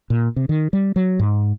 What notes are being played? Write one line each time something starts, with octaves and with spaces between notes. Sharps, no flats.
A#2
C3
D#3
G3
F#3
G#2